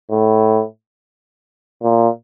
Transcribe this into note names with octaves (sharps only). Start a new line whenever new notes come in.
A2
A#2